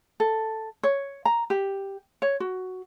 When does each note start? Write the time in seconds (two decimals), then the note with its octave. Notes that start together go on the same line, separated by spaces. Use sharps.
0.20 A4
0.83 C#5
1.25 A#5
1.50 G4
2.22 C#5
2.40 F#4